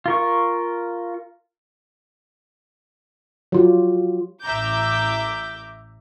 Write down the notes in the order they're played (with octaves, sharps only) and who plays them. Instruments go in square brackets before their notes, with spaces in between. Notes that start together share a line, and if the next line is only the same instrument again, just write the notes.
[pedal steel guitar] F4 A#4 C#6
[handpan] F#3 F4 G4
[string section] A1 E5 A#5 D6 G6